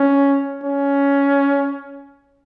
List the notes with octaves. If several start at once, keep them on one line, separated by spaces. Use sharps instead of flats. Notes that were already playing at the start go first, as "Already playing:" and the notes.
Already playing: C#4
C#4